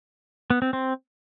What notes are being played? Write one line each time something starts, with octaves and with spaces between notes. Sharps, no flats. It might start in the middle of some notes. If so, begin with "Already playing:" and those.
B3
C4
C4